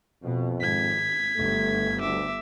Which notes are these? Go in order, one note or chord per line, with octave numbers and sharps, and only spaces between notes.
F2 B2
G#1 G#6 B6
G1 A3
D2 E5 D6